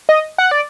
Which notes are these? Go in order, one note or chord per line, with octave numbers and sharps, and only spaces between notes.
D#5
F#5
D5